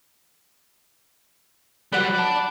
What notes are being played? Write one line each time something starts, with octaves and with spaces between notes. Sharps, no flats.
F#3 G3 B4 F#5
D5 A5